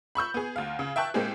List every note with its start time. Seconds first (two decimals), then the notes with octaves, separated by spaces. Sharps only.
0.15 B5 C#6 E6 G6
0.34 B3 G#4
0.56 D2 F5
0.79 C#3
0.96 E5 G5 A5 C#6 F#6
1.14 A2 G#3 A#3 C4 G4 G#4